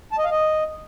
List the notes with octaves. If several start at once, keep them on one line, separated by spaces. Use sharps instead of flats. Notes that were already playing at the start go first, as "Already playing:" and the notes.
A5
D#5
F5
D#5